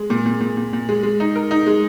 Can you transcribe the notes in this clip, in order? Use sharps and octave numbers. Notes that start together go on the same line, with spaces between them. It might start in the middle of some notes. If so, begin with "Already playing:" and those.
Already playing: G#3
A#2
A#2
A#2
A#2
A#2
G#3
G#3
D#4
A#4
D#4
G#3